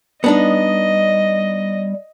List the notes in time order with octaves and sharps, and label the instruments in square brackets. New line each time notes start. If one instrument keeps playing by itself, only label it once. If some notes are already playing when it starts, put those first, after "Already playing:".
[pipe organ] G3 [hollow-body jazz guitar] B3 D4 D#4 [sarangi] D#5